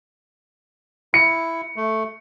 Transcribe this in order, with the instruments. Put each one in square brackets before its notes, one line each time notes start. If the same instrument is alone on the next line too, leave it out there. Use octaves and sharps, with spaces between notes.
[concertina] E4 [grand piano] C#7
[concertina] A3